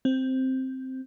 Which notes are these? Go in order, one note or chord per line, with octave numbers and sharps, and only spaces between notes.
C4